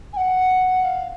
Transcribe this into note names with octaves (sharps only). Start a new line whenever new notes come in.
G#5
F#5
F5